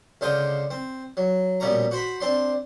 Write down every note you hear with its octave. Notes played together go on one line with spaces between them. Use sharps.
C#2 D3 C5 F5 G5 D#6
C4
F#3
A#1 B2 G3 C#4 A#5
F#4 C5 B5
C4 D4 C6